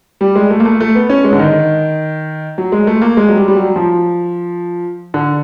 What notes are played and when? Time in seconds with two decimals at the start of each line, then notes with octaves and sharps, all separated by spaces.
0.21 G3
0.36 G#3
0.50 A3
0.60 A#3
0.65 A3
0.80 A3
0.95 B3
1.10 C#4
1.24 G#3
1.33 D3
1.39 D#3
2.58 F#3
2.72 G#3
2.87 A3
3.02 A#3
3.17 G#3
3.28 F#3
3.37 G3
3.48 G3
3.56 F#3
3.76 F3
5.14 D3